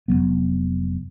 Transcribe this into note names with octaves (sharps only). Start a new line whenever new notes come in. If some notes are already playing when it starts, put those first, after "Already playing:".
F1 D#2 F#3 B3